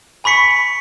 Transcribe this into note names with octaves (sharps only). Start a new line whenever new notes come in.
G#5 B5 C#6 B6 C#7